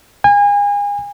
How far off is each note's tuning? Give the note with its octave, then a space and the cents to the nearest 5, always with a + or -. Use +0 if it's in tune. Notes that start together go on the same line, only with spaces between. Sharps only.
G#5 -35